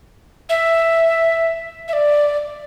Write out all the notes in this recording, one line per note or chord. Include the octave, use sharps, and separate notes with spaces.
E5
E5
D5